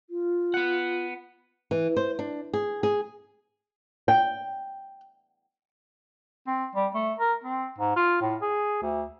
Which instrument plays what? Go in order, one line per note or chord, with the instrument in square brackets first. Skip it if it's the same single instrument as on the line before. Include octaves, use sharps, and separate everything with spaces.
[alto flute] F4
[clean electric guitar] B3 F#5
[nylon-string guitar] E3
C5
D4
G#4
G#4
G5
[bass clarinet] C4
G3
A3
A#4
C4
G#2
F4
A2
G#4
D2